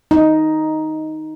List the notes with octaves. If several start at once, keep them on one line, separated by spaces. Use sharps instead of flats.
D#4